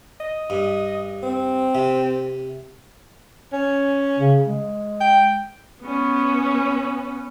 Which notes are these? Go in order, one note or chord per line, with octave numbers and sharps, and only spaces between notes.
D#5
G2
C4
C3
C#4
C#3
G#3
G5
B3 C#4